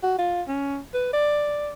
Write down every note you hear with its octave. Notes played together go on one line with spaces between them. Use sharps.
F#4
F4
C#4
B4
D5